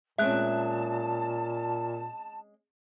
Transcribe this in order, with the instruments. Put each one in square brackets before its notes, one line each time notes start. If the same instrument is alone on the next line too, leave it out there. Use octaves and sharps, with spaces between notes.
[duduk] A#2 [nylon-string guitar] G#3 C4 C#4 [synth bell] E5 F#6 [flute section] A5